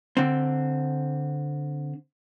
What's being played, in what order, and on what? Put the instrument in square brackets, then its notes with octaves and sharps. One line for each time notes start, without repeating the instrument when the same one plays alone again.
[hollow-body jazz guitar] D3 C4